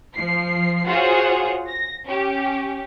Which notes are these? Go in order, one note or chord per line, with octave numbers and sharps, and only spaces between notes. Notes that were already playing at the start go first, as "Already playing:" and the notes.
F3 C7
F4 F#4 G#4 C5 C#5 F#5
A#6
C#4 G4